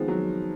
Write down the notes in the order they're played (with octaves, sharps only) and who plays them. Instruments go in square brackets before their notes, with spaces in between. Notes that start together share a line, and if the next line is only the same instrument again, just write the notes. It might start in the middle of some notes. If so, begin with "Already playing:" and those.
Already playing: [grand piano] F2 D#3 G#3 B3 [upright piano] F3
[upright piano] F#3